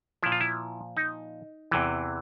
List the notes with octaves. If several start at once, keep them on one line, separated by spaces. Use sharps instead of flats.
A#2 F3 E4
F4
E4
D#4
E2 C3 E3